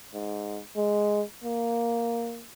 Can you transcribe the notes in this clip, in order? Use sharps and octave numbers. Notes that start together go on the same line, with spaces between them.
G#2
G#3
A#3